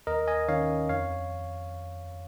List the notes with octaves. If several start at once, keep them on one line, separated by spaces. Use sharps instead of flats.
D#2 A#4 D#5
D#5 G#5
D#3 C#4 C#5 F5
F2 C#5 F5